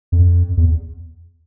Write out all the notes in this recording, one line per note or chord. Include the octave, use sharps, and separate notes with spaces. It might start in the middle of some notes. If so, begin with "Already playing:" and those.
F2
E2